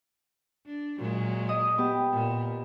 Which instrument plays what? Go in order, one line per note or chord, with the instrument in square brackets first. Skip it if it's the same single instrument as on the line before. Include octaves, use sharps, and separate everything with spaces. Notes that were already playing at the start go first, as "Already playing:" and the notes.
[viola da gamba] D4
A#2 F#3 G#3
[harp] D#5 D#6
B3 G4
[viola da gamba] A#2